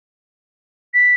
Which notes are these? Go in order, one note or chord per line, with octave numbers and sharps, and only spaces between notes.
B6